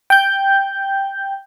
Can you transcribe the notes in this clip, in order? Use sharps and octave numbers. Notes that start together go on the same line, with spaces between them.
G5 G6